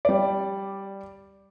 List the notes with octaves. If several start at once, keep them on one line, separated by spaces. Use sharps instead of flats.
G3 D5